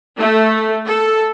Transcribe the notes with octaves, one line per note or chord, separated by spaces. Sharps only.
A3
A4